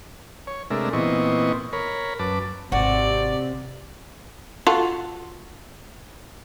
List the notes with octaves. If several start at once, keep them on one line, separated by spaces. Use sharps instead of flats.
C#5
C3 G#3 A3 D4 A#4 E5
A#2 E3 B3 C4 D#5 C#6
A#4 C#5 B5
F#2 B4 A5 D6
G#1 C3 F#4 D5
F4 F#4 A4